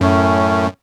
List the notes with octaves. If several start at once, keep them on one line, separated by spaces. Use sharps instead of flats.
F#2 A2 A3 C#4